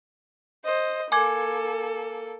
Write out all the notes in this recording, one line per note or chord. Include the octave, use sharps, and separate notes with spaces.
C5 D#5
A#3 A4 G#5 D6 G#6